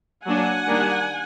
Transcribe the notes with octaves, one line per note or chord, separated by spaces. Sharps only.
F#3 A#3 D4 F#5 G#5
D#3 G3 A#3 D4